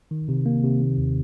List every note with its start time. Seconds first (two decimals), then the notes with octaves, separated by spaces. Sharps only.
0.11 D#3
0.29 C3
0.46 A#3
0.63 C3
0.80 D#3
0.98 D#2